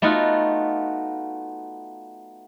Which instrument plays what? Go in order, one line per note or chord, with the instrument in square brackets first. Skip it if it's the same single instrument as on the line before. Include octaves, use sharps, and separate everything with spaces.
[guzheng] A3 B3 D#4 F4 F#4